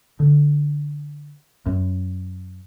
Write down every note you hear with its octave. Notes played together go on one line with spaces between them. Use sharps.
D3
F#2